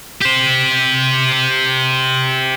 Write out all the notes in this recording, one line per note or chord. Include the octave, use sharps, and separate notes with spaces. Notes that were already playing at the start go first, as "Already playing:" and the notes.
G4 C5